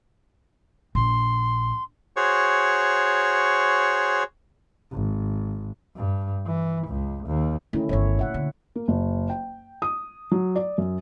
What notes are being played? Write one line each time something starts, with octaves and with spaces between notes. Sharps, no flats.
A#1 C6
F#4 G#4 C5 C#5 C#6
G#1
G2
E3
C#2
D#2
D#3 A3 C#4 E4
G1 D#3 C#5 E5
A#2 E5 F#5
D3
A#3
F#1
G5
D#6
F#3
D5
F#2